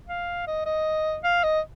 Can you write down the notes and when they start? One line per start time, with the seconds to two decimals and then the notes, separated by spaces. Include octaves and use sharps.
0.08 F5
0.47 D#5
0.66 D#5
1.24 F5
1.43 D#5